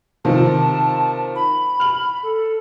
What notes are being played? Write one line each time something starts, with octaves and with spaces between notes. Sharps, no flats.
C3 D#3 F3 A5
B5
F6 F#7
A4